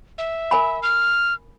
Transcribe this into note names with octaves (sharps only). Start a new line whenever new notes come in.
E5
A#4 G#5 B5
F6